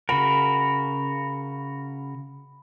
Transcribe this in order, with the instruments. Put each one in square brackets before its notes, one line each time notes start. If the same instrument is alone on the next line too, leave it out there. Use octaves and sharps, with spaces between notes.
[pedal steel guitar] C#3 F#4 A#4 [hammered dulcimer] B5